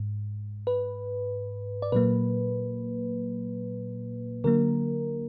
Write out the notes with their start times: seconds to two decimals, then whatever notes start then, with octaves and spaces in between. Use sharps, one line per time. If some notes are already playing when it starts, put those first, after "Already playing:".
Already playing: G#2
0.67 B4
1.82 D5
1.92 A#2 F#3 A#3 B4
4.44 D3 F#3 A#3 A#4